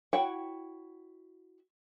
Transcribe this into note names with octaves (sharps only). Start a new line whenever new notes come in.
E4 F#4 C#5 F#5 G5